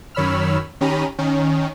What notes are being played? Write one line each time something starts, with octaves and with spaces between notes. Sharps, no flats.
F#2 D#3 C#5 B5 E6 F6
D#3 C#4 G4 A#5 B5 D#7
D#3 C#4